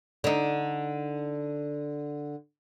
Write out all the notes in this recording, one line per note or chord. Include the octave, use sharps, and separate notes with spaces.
D3 D#4